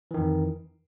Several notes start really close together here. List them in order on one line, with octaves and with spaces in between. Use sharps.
E3 D#3 F2